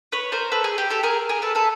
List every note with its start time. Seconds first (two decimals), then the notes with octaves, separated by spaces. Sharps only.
0.12 B4 C#5
0.32 A#4 C5
0.52 A4 B4
0.64 G#4
0.78 G4
0.90 G4 A4
1.03 G#4 A#4
1.29 G#4 A#4
1.42 A4 B4
1.55 A4 B4